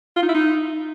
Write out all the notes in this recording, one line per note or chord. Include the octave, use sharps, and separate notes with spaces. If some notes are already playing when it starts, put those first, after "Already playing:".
F4
D#4
E4
D#4